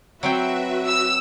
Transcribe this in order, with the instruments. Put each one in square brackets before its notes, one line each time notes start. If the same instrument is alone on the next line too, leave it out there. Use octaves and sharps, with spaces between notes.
[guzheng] F#3 C4 G5 [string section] F#4 B4 E5
[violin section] E6